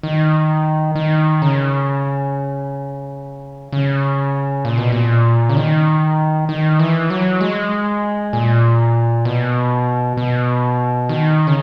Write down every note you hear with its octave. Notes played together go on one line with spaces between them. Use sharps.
D#3
D#3
C#3
C#3
A#2
B2
A#2
C#3
D#3
D#3
E3
F#3
G#3
A#2
B2
B2
D#3
C#3